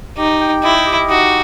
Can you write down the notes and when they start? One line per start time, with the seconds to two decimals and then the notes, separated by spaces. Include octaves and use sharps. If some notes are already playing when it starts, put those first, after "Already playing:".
0.17 D#4 G4
0.41 G5
0.63 E4 D#5
0.86 G4
1.10 D#4 F#4